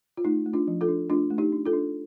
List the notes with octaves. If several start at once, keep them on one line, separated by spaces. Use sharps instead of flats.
F4
A3 D#4
A3
D4 F4
F3
F4 A4
D4
A3 D4 F4
A3
D#4 G4
D4
F4 A4
D4